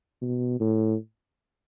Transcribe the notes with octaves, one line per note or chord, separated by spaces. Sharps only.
B2
A2